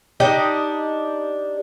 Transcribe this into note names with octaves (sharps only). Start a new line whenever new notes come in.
D4 D#4 G4 D#5